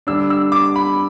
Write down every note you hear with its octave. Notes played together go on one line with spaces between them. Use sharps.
D3 G3 D4 E6
E6
D6
B5